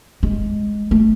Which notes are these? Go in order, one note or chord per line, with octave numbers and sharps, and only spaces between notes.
G#3
A3